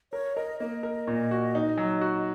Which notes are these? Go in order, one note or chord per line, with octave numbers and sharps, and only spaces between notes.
A#4 C#5
A#4 D#5
A#3 D#5
A#4
A#2
F#4
D#4
F#3
F#4